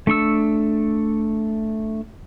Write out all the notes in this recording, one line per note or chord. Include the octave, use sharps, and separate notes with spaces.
A3 D4 C#6 E6